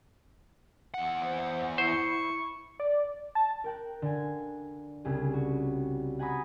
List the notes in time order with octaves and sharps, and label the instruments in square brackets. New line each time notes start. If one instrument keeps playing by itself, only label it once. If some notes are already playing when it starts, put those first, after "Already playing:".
[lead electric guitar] E2 F#5
[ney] C5
[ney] E4 [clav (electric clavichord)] C5 [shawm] C#6
[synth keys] D5
A5
[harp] A#4 G5 F#6
D3 G#5
C2 C#3 G#4
F#4
F#5 G#5 A#5 B5 D#6